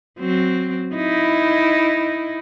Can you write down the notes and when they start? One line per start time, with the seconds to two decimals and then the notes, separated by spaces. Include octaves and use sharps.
0.20 F#3 C4
0.95 D#4 E4